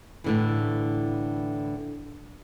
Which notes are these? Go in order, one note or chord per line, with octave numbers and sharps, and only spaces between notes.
A2 D3 E3